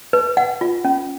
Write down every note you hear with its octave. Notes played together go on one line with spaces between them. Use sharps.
B4
F#5
F4
C#4